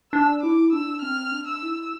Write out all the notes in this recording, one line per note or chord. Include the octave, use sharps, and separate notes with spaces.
D4 E6
E4 D6
D4 E6
C4 F6
D4
E6
E4